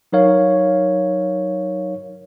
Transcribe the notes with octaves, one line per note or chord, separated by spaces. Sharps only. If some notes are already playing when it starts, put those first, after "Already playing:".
F#3 D#4 A#4 C#5 F5